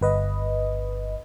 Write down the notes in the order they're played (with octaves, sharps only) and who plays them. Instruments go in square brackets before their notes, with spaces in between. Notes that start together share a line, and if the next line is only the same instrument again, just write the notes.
[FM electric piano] G1 B4 D#5